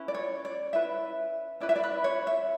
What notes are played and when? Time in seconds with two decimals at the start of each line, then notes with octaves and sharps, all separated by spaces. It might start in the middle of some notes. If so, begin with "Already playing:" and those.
Already playing: C#4 E4 B4
0.08 D5
0.14 C#5
0.45 D5
0.73 C#4 E4 B4 E5
1.60 C#4 E4 B4 D5
1.69 E5
1.76 D5
1.84 B4
2.04 C#5
2.27 E5